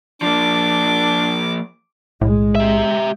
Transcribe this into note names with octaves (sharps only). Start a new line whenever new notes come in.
F3 A#3 D4 D6
B1 A2 G#3
G4 E5